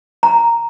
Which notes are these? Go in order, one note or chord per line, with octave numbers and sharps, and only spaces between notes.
A#5